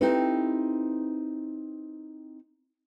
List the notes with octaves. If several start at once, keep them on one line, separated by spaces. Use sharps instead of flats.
C4 D#4 E4 G4 A4 B4